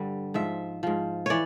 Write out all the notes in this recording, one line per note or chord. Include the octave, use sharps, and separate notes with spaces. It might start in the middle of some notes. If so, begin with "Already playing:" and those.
Already playing: G2 D3 G3
G#2 F3 E5
G#2 F3
E3 C#5 D5